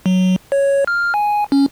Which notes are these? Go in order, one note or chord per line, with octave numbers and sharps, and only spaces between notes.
F#3
C#5
F6
G#5
C#4